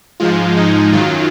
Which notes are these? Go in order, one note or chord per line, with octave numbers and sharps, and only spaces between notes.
G#2 F3 G#3 F4
D#4
F#2 D#3 F#3 F4